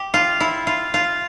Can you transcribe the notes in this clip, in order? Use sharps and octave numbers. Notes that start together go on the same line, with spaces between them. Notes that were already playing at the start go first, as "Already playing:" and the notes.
Already playing: G4
F4
E4
F4
F4